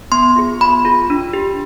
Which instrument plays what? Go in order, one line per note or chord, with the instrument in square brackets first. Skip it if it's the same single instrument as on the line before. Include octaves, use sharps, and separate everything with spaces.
[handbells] B3 C6
F4 G#4
B3 B5
F4 G#4
D4
G4